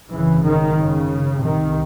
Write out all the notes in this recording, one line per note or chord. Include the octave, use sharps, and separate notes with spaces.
G#1 F#2 C#3 E3
D#3
C#3
C2 C3 D#3